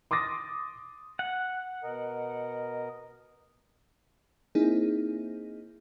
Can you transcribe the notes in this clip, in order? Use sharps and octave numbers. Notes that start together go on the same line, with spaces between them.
C6 D6 D#6 A6 A#6
F#5
B2 A#4 D#5
A#3 C4 D#4 E4 G#4